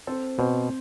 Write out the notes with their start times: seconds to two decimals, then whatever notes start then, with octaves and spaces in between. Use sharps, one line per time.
0.07 C4 A4 C5
0.38 B2 C4 C5